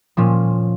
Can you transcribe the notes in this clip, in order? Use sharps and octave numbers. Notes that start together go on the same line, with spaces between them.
A#2 F3 C#4